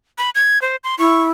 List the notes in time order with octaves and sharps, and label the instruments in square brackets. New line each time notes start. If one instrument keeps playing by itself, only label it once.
[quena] B5
G#6
C5
C6
[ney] E4 [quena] C#6